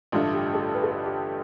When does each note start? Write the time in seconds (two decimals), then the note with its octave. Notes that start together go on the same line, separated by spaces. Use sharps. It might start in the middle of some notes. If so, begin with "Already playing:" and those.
0.12 A1 G2 D3 A3 F4
0.33 G4
0.53 A4
0.75 B4
0.83 A4
0.92 B4
1.05 G4